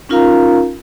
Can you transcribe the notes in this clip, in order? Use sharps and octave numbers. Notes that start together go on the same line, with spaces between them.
C#4 D#4 F4 A#4 F5 A#5